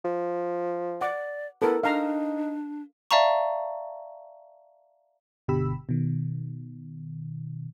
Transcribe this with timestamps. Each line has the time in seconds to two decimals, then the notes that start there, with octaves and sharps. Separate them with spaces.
0.05 F3
1.01 D5 F#5 D6
1.62 B3 E4 A4 A#4
1.83 D4 D#4 F5 A#5
3.11 D5 E5 F5 A5 A#5 C#6
5.48 G1 B2 D3 G4 B5 E6
5.89 B2 D#3